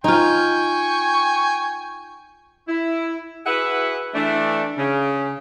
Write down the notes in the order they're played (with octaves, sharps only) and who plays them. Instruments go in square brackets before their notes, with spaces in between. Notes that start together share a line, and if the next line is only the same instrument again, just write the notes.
[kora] D#4 F4 [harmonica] G5 G#5 C#6
[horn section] E4
E4 F#4 G#4 B4 E5 F#5
E3 A3 D4
C#3